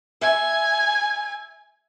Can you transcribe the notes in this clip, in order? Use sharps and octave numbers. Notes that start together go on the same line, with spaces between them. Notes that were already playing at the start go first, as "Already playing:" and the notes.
E5 G#5